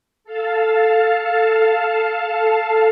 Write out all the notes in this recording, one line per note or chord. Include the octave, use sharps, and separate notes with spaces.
A4 F5 A5